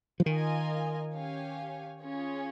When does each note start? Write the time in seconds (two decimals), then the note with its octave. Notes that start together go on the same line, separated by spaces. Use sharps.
0.20 F3
0.26 D#3 F4 A#4 D#5 G#5
1.14 C#4 G4 C#5 F5 G#5
2.01 C#4 F4 G#4 C#5